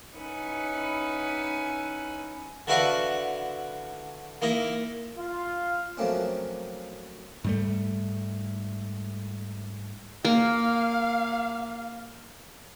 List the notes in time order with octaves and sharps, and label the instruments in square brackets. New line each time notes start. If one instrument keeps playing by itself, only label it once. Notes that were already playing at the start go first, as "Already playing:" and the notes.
[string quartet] C#4 D#4 E4 B4 F#5 G#5
[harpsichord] D3 E4 F#4 B4 F5 C#6
A#3 D#4 E4
[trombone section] F4
[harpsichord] F3 F#3 A3 A#3 C4 C#4
[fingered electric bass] G#2 G3 A3
[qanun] A#3 [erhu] F5